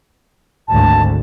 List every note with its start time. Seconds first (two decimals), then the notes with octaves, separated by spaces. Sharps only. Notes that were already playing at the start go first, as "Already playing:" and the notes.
0.68 G#1 D2 G#2 A5